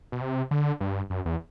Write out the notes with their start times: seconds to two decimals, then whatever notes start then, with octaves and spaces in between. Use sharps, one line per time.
0.12 B2
0.21 C3
0.51 D3
0.81 G2
1.10 F#2
1.25 E2